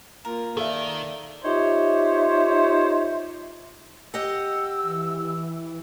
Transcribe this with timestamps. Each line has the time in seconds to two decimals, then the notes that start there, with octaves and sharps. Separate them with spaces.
0.25 A#3 F4 A#4
0.57 D#3 A4 D5 E5 F5
1.44 D#4 F4 G4 C5 C#5 E5
4.14 G4 D#5 F#5 E6
4.82 E3